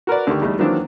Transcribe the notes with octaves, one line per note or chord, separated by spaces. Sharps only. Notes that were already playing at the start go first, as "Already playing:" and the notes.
F#4 A#4 B4 D5
D2 D3 D#3 G4 G5 C#6
E2 G3 A3 D#4
D#3 E3 F#3 A#3 C4 D4